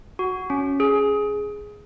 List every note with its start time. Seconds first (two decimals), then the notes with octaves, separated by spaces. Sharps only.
0.19 F#4
0.50 C#4
0.80 G#4